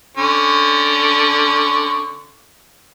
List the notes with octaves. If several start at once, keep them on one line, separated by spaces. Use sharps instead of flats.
D3 C#4 C#6